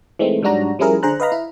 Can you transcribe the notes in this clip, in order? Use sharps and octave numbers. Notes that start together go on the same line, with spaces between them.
E3 G#3 A3 C4 D#4
G#2 F#3 G3 D4 F#4 A#5
F3 G3 C#4 E4 G#4 A#4
D3 G#4 C5 A#5 F#6
B4 D#5 F5 A#5 B5
E4